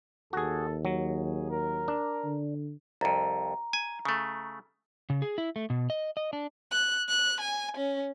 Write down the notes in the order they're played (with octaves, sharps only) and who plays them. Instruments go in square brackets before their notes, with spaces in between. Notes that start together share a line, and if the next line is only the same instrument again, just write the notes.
[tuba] D#2 [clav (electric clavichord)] F#4 G#4 [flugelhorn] A4
[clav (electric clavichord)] F#3 [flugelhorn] G#4
[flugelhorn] A#4
[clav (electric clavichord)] D4
[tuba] D3
[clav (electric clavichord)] C2 F2 [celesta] A#5
[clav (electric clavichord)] G#5
C#3 A3
[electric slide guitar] C#3
G#4
E4
A3
B2
D#5
D#5
D4
[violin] F#6
F#6
G#5
C#4